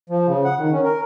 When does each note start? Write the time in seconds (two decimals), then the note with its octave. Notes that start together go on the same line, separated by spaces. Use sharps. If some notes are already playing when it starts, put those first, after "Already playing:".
0.10 F3
0.28 C#3
0.44 F#5
0.58 D#3
0.73 C#4
0.84 A#4